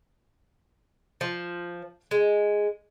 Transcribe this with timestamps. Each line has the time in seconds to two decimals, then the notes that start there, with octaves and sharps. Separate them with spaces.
1.21 F3
2.11 G#3